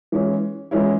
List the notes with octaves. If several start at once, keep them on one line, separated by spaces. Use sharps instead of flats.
E3 G#3 C#4
E3 G#3 C#4 E4